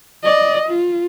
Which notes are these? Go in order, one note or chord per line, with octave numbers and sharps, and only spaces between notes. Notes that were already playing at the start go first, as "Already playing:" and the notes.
D5 D#5
F4